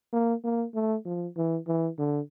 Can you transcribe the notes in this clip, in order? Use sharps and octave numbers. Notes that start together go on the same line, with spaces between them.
A#3
A#3
A3
F3
E3
E3
D3